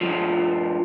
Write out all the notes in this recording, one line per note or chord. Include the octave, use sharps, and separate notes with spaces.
G2 F3